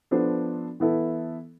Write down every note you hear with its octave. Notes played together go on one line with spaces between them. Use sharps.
F3 B3 D4 A4 C5
E3 B3 E4 A4